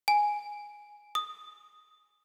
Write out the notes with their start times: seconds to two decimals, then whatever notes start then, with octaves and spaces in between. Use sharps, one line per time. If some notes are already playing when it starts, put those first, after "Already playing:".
0.08 G#5
1.15 D#6